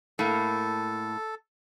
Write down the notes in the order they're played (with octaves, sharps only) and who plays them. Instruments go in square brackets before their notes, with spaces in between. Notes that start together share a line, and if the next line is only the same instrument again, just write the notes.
[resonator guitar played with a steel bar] A2 A#3 [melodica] A4